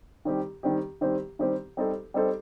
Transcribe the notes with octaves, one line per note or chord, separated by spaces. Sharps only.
D#3 G3 C4 G4
D#3 G3 C4 G4
D#3 G3 C4 G4 C5
D#3 G3 C4 G4 C5
G3 C4 D#4 A4 C5
G3 C4 D#4 A4 C5